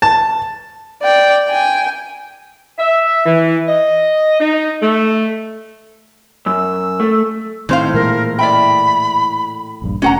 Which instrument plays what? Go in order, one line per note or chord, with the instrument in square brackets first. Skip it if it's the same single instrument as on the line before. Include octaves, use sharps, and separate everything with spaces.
[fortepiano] A5
[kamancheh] D5 G5
G5 G#5
[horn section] E5
E3
D#5
D#4
A3
[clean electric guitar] F#2 [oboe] E6
[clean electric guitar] A3
[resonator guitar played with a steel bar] A2 C5 F5 [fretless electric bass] D#3 C4
[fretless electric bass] A#2 E3 G#3 [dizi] A#4
[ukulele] D5 E5 G5 [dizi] B5
[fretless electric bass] D#1 A#1 G2
[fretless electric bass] F1 A3 [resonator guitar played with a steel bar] C#4 [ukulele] F#4 F#5 A#5